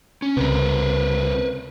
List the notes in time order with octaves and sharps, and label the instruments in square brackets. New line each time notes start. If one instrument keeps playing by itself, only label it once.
[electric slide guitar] C#4
[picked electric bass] C#2 C3 [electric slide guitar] A#4 B4